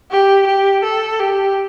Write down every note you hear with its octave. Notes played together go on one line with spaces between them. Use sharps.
G4
G4
A4
G4